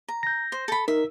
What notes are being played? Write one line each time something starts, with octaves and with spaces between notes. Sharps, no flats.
A#5
G6 A#6
C5
A4 B5
D#4 A#4 E5